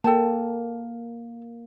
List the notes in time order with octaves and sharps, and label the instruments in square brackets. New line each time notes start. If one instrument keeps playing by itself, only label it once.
[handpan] A#3 [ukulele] A4 G5 A5